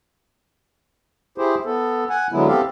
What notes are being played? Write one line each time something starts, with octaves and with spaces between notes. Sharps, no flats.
E4 G4 G#4 C5
B3 A4
F#5 G#5
D3 F#3 G#3 B3 E4
B3 C4 G4 A4 F5